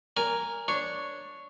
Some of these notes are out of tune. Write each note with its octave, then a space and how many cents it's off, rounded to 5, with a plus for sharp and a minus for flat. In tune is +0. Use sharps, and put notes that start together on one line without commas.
A#4 +0 D5 -45 G#5 -10
D4 +0 C#5 +0